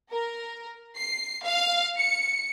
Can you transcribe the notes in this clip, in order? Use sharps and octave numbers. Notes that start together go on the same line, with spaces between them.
A#4
C7
F5
C#7